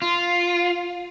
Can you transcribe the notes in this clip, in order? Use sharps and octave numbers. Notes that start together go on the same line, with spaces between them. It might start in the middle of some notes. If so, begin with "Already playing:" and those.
F4